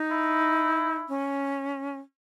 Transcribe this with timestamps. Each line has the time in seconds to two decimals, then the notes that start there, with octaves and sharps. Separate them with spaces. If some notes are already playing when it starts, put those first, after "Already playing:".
Already playing: D#4
0.11 E4
1.09 C#4